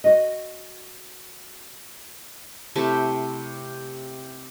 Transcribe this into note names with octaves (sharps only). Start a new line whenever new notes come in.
F#4 D#5
C3 A3 E4 A5